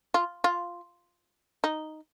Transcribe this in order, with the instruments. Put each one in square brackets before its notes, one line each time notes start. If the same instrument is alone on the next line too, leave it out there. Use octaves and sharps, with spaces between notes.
[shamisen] F4
F4
D#4